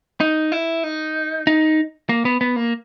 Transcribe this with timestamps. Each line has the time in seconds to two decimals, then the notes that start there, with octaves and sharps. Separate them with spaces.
0.20 D#4
0.52 E4
0.84 D#4
1.47 D#4
2.09 A#3
2.25 B3
2.41 B3
2.56 A#3